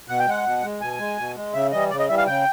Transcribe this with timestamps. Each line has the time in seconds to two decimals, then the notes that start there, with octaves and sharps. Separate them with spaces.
0.08 B2 F#5
0.19 G5
0.26 G#3 F#5
0.45 B2
0.63 G#3
0.81 B2 G#5
0.99 G#3
1.18 B2
1.36 G#3
1.54 C#3 E5
1.72 E3 G3 D#5
1.90 C#3 D5
1.99 D#5
2.08 E3 G3 E5
2.18 F5
2.27 C#3 G5